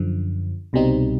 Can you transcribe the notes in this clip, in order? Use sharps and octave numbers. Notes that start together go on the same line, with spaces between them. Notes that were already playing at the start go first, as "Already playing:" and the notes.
Already playing: F#2 D3 F3
C2 B2 G3 C4 D#4